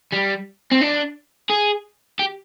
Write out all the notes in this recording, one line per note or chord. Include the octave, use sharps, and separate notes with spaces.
G3
C4
D4
G#4
G4